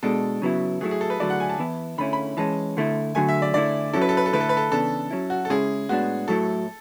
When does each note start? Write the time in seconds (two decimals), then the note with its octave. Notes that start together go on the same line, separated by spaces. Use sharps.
0.03 B2 G#3 D4 A4
0.42 C#3 F#3 B3 E4
0.81 F#3 A3 E4 G#4
0.91 G#4
1.01 A4
1.10 B4
1.20 D3 F#3 A3 E4 D5
1.30 F#5
1.40 G#5
1.49 A5
1.59 E3 B3 E4
1.98 D3 A3 C#4 E4 B5
2.13 B5
2.37 E3 G#3 C#4 A5
2.77 D3 A3 E4
3.15 D3 F#3 A3 G#5
3.29 E5
3.42 D5
3.54 D3 A3 E4 D5
3.93 F#3 C#4 E4 A4
4.02 B4
4.09 A4
4.17 B4
4.26 A4
4.33 D3 A3 E4 B4
4.41 A4
4.49 B4
4.57 A4
4.72 C#3 E3 B3 D4 A4
5.11 F#3 C#4 E4
5.30 F#4
5.45 A4
5.50 C#3 G#3 C#4 E4 G#4
5.89 A2 G#3 B3 D4 F#4
6.28 A2 F#3 A3 E4 A4